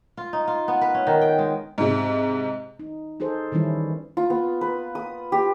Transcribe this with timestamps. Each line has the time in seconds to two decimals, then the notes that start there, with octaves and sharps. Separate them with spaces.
0.17 F4
0.33 D#4
0.48 F4
0.68 B3
0.81 B4
0.94 C#4
1.07 D#3
1.21 G5
1.38 G#3
1.78 G#2 C3
2.79 D#4
3.20 D#4 G#4 A4 C5
3.52 D#3 E3 G3 C#4 E4
4.17 F4
4.30 B3
4.61 B4
4.95 D#6
5.32 G4